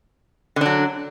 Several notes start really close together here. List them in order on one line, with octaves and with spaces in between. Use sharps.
D3 D4 F#3